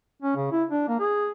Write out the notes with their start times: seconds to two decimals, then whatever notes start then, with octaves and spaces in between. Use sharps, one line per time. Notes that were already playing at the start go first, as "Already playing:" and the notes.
0.22 C#4
0.36 C#3
0.51 E4
0.70 D4
0.88 A#3
0.99 G#4